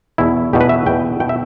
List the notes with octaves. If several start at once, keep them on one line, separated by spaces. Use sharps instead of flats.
E2 B2 E4
E2 B2 G4
B4
E5
E2 B2 G5
B2 G5
E5